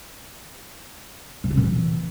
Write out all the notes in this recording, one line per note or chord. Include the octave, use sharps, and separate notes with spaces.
C3
C#3
A#2
E3